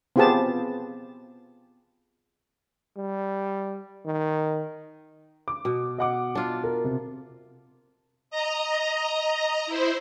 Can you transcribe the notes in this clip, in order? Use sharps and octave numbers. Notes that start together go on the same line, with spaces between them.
B3 C4 F4 G4 G#4 A5
G3
D#3
D6
B2
D#5 F#5 D6
D4 F4
A#4
C3
D#5 A#5
E4 C5